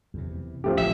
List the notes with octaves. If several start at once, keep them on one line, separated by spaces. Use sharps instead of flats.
E2 C3
F3 A3 C#4 G4
A#1 E5